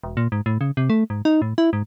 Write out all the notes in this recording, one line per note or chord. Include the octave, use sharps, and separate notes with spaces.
E1
A#2
G#2
A2
C#3
C3
A3
G#2
D#4
A2
E4
G#2